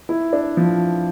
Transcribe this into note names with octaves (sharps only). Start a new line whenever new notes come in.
E4
D4
F3